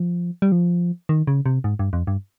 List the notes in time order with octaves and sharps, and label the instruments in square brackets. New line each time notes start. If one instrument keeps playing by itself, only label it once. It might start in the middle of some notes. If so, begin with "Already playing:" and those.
Already playing: [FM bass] F3
G3
F3
D#3
C#3
C3
G#2
G2
F2
G2